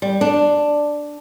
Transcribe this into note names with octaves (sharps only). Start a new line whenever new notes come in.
G3
D4